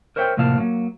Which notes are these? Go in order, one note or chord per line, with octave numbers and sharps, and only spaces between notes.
A#4 C5 C#5 E5 G5
A2 C3 F3 A#3 F5 A5
F#3 A#3